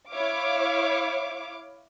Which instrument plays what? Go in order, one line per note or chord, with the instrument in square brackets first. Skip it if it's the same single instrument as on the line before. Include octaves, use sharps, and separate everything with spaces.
[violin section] E4 C#5 F5 D6